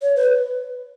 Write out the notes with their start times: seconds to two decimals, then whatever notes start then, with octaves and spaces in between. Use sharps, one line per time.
0.02 C#5
0.16 B4